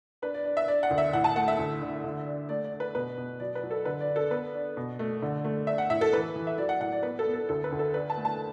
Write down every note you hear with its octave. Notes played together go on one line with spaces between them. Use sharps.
D4 B4
D5
D4
E5
D4 D5
F#5
D2
E5
A2 F#5
A5
A3 F#5
E5
D2
D3
D3
D4
A3 D5
D5
D4
B4
B2 B4
B2
F#3 D5
B4
F#3
A4
D3 B4
D5
D4
A4
B3 B4
D4
B2
A3
D3
A3
D4 E5
F#5
A2 E5
A4
E3 B4
E3
E5
F#3 D5
F#5
A2 F#5
D5
B3 B4
A4
B3
A4
D2 A4
B4
D2
A4
D4 B4
A5
A3
A5